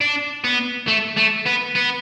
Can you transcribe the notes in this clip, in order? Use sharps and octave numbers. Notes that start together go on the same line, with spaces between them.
D4
B3
A3
A3
B3
B3